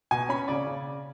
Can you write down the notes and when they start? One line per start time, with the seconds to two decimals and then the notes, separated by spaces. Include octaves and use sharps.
0.11 B2 G#5
0.29 C#4 B5
0.48 C#3 D5
0.67 C#3